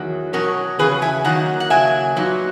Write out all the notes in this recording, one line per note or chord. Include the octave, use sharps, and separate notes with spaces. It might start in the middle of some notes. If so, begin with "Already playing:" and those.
Already playing: E2 D#3 F#3
B2 F#3 C#4 A#4 C#5
E2 C#3 F#3 C#4 G#4 B4
E5 G#5
D#3 F#3 A#3 D#4 F#5 A#5
F#5
C#3 F#3 A#3 E5 G#5
A#2 F#3 B3 D#4